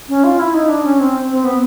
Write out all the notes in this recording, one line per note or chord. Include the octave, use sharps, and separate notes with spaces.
C#4
F4
E4
D#4
D4
C#4
C4
C4
B3